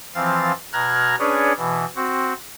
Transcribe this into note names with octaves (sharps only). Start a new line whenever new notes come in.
E3 F3 C4 F5 A6
B2 A#5 F6 F#6 G#6 A#6
C#4 D4 G#4 B4 C#5 D5
B2 E3
C4 F#4